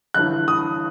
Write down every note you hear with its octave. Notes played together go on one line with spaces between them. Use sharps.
G1 G2 E3 F#6
D#6